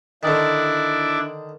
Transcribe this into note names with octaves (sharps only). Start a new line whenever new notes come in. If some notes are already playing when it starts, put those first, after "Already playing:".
D3 D#3 D4 E4 D5